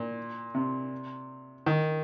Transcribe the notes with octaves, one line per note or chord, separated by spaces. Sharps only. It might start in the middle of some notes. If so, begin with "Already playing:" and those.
Already playing: A#2
C3
D#3